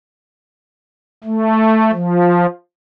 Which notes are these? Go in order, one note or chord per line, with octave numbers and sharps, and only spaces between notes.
A3
F3